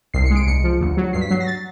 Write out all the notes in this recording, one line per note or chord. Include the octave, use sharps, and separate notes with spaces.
C2 C7
C#7
G#3
D7
C2 C#7
F3
D2
F#3
G2 C7
B6
F#3 C7
A#6
A6